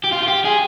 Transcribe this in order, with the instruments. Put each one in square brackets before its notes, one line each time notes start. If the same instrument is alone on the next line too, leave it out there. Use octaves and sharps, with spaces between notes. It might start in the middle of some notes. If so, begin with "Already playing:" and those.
[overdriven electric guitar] G4
F4
F4
G4
G#4